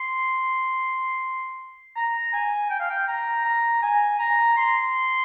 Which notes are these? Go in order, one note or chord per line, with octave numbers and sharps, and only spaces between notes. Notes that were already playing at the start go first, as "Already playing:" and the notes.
Already playing: C6
A#5
G#5
G5
F5
G5
A#5
A#5
G#5
A#5
C6